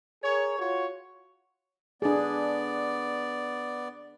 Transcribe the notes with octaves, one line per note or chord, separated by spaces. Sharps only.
G#4 A#4 C#5
F4 F#4 C#5
B3 D4 G#4 D5